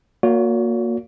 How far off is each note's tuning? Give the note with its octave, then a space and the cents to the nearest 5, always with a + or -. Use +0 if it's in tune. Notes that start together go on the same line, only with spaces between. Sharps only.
A#3 +0 F#4 -30 C#5 +40